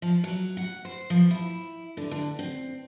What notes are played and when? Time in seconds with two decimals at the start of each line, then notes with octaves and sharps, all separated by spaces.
0.02 F3
0.24 F#3
0.57 F#5
0.85 C5
1.10 F3
1.31 E4
1.97 D3
2.11 D3
2.39 C4